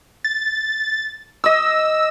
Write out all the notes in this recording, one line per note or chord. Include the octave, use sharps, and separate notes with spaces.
A6
D#5 D6 E6